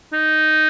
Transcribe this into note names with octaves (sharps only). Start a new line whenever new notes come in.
D#4